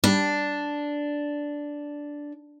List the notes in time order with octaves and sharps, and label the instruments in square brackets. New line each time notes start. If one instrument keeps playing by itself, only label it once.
[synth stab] G3 [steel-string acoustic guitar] D4